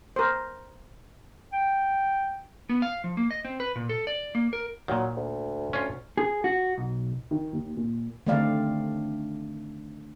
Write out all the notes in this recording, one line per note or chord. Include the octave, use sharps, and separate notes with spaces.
A#4 C5
G5
B3
F5
F3
A#3
D#5
C4
B4
A#2
A4
D5
A#3
A#4
A#2 D#3 F#3
D2
C#4 F4
G#4
F#4
B1
D#3
D#2
A#2
D3 D#3 A3 C4 D5 F5